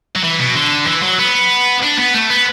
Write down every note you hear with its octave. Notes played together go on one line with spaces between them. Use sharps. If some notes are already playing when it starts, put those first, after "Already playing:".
F#3
E3
B2
D3
E3
F#3
B3
D4
B3
A3
B3